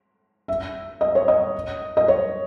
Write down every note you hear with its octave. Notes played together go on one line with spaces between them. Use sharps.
E5
D#5
C#5
D#5
D#5
C#5